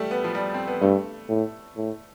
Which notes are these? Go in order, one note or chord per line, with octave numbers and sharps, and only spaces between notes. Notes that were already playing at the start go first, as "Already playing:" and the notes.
Already playing: G3 A3
B3
F3
G3
C4
B3
G2 A3
A2
A2